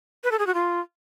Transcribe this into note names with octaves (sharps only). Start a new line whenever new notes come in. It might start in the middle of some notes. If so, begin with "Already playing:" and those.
B4
A4
G#4
F#4
F4